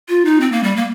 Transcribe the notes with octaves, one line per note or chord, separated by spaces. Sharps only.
F4
D#4
C4
A#3
G3
A#3